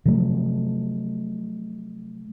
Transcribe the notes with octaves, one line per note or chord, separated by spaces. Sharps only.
C3 F3 F#3 A3